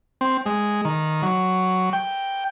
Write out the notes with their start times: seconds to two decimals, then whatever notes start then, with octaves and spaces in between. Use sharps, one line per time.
0.21 C4
0.46 G#3
0.85 D#3
1.23 F#3
1.93 G5